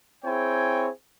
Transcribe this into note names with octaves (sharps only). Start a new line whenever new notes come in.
C4 E4 G#4 C#5 G5 G#5